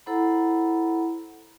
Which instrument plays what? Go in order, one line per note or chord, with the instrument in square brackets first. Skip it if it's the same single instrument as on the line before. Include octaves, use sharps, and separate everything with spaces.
[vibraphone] E4 A4 C5 F#5 A#5 B5